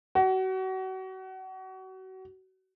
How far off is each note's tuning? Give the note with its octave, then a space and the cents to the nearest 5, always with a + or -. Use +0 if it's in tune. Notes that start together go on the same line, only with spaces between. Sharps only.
F#4 +30